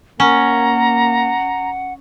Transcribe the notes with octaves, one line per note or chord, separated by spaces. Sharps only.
A#3 C#4 F#5 A#5